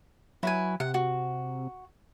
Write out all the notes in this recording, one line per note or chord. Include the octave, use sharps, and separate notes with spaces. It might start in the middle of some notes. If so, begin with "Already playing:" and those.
F#3 E4 B4 G#5
C3 F#5
F#4